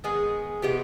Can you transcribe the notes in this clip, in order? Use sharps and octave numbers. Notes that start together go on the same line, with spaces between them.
D#3 G#3 B3 G#4
C3 E3 G#3 B3 G4